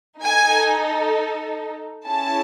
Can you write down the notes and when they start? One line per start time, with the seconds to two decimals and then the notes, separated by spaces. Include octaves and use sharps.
0.21 D#4 A4 G#5
2.06 C#4 E4 G#4 A5